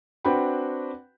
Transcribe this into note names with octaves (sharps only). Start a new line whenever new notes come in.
C4 D4 F#4 B4 G5 B5